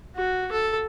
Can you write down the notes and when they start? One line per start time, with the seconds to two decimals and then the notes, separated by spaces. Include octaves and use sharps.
0.15 F#4
0.52 A4